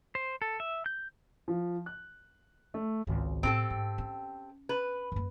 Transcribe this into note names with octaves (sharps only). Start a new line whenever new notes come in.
C5
A4
E5
G6
F3
F#6
A3
G#1 C#2
A2 C3 C4 G4 A4
G#2
C#4
B4
F#2 A#3